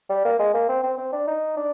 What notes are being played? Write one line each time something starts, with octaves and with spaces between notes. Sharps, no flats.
G3
A#3
G#3
A#3
C4
C4
C4
D4
D#4
D4